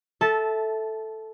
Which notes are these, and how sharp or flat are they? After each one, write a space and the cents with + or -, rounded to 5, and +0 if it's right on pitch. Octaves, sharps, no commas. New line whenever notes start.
A4 +0 E5 -10 A5 -15